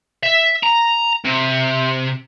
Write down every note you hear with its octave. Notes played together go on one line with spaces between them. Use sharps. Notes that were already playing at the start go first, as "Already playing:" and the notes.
E5
A#5
C3